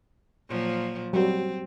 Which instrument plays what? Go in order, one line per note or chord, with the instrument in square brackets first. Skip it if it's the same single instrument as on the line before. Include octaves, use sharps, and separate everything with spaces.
[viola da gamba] A#2 F3 F#3
[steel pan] F#3 G3 [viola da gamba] C4